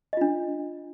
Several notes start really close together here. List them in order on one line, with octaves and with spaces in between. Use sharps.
D#5 F4 D4